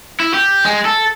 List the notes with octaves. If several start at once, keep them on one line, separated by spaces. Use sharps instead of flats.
E4
G4
G#3
A4